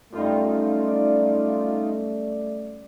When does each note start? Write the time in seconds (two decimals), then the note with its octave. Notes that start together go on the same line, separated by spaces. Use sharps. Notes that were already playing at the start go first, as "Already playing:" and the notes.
0.13 F#2 G3 A3 D#4 F4
0.88 D5